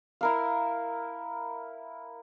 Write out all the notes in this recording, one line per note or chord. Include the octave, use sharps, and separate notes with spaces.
E4 A#4 F5